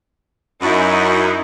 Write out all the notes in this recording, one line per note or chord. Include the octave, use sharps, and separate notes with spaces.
F#2 D#4 E4